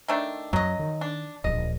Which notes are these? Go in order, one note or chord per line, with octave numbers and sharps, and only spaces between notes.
D#3 A3 D4
F#2 F#3 D#5
D#3
D4
D1 A#1 D#5